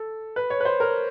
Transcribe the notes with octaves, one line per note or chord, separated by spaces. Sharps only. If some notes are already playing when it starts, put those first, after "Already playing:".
Already playing: A4
B4
C#5
B4
C5
A#4